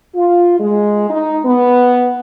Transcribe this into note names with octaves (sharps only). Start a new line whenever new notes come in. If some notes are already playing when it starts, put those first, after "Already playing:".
F4
G#3
D#4
B3